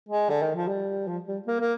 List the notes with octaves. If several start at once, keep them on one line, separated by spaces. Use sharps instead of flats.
G#3
D3
D#3
F3
G3
F3
G3
A#3
A#3